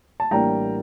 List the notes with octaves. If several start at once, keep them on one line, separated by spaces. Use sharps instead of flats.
A5
A1 A2 G3 A#3 D4 G5 A#5